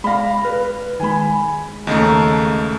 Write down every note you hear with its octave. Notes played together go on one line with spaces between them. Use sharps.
G#3 D5 F5 B5 A#6
B4 F6
D#3 G#3 G#5 B5
D#2 C#3 A3 D#5 A#5